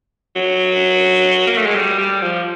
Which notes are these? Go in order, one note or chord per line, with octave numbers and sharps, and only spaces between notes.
F#3
A#3
A3
G#3
G3
G3
F3